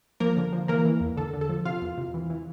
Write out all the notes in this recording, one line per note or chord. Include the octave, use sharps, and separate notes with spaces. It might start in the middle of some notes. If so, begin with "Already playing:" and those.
F3 A#3 A#4
D3
F3
E3 A#3 A#4
E3
E2
D3 A4
D3
A4
F3
C3 F4 F5
E2
C3
E3
E3